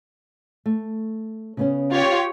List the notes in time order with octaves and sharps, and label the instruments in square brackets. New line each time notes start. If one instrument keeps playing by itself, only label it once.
[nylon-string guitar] A3
C#3 B3 C#4
[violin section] F4 G4 C#5